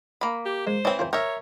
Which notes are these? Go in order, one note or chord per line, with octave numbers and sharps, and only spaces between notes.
A#3 B5
G4
G#3 C5
E3 C4 C#5
F4 A#4 C5
A#4 C#5 E5 G5